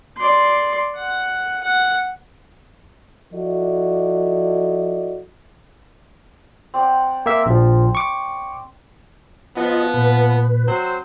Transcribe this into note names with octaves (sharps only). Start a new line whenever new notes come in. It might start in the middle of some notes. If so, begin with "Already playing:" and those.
D5 C6
F#5
F#5
F3 E4 F#4 A4 D5 D#5
C4 D5 F#5
A#3 E5
A#1 F3
C#6 D6
F3 B3 F4 D#5
A#2 B4
F#3 C4 C5